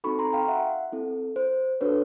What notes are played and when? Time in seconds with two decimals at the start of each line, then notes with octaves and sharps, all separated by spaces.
0.04 C4 D#4 F#4 A4 B5 C#6
0.19 A#5 C6
0.33 F5 G5
0.48 E5 F#5
0.92 C4 E4 A4
1.36 C5
1.81 D4 F#4 A4 B4 C#5